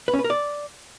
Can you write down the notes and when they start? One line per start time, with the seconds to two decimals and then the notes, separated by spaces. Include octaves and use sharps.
0.08 B4
0.13 C#4
0.19 B4
0.24 A#4
0.30 D5